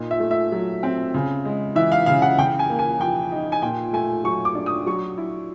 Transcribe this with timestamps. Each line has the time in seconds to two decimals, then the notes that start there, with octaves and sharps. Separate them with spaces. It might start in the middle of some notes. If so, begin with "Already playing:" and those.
Already playing: A#2 D#4
0.11 E5
0.20 A3
0.31 E5
0.52 F#3
0.83 C4
1.14 C#3
1.45 G#3
1.76 E3 E5
1.92 F5
2.06 C#3 F5
2.22 F#5
2.38 C#3 G5
2.59 G#5
2.70 A#3
2.79 G#5
2.99 F3 G5
3.32 D#4
3.52 G#5
3.62 A#2 G5
3.93 A3 G#5
4.24 F#3 C#6
4.45 D6
4.55 D4
4.66 D#6
4.87 F#3 C#6
5.18 E4